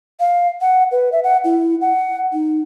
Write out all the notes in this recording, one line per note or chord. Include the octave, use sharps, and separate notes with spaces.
F5
F#5
B4
E5
F#5
E4
F#5
D#4